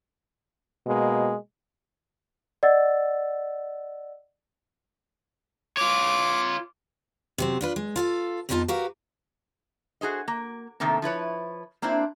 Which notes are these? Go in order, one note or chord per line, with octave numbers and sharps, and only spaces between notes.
B2 G#3 A#3
D5 D#5 F#5 E6 A6
F4 C#5 D6
C3 F#3 C4
D4 F4 B4
G#3
F4 A4 F5
F2 E3 B3 D#4 F4 A5
F#4 G4 A#4 B4 F5
F#4 G#4 C5 D#5
A#3
C3 D#3 A3 A#3 C4
F3 E4 B4 C#5
A#3 C4 D4 E4 C5